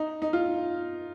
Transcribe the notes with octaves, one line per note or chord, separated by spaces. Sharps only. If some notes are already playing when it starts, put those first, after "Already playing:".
Already playing: D#4
D#4
F4